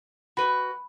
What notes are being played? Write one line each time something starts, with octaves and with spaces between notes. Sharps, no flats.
F#4 B4 B5